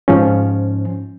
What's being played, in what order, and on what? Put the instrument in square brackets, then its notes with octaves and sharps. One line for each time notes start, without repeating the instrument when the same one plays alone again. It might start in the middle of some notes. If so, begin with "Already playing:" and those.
[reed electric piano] G#2 F3 C#4